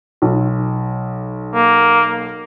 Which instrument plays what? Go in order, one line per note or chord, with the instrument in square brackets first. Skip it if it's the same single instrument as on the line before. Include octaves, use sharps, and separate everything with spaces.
[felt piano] B1
[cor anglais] A#3